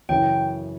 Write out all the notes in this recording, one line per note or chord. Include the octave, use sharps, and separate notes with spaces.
F#2 C#3 E3 G5